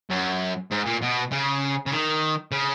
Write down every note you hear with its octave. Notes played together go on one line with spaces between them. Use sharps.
F#2
G#2
A#2
B2
C#3
C#3
D#3
C#3